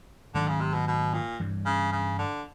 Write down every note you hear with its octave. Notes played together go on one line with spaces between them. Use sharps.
G#2 D3 D#3 F#3 A3
C#3
C3
B2
B2
A#2
G2 E3 G3
C#3
C#3
D3